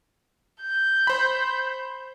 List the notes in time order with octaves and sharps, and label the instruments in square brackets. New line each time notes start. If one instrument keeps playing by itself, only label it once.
[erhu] G6
[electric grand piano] C5 B5